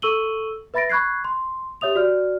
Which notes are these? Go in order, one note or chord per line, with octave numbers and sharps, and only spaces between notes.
A4 C#6 E6 D#7 F#7 G7
B4 E5 B5 A6 A#6 D7
B5 C#6 F#6 G#6 C7
C6
G4 C#5 E5 D#6 F7
F#4 D5 F6